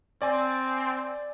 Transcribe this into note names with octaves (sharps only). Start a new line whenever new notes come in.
C4 D5 G#5